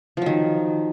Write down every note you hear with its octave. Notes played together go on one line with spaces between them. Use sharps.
D#3 F3 F#3